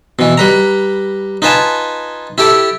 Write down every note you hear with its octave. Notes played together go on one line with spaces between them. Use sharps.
B2 E3
G3 B4 A#5
D#4 F4 B4 G#5 A5
E4 G4 A4 D6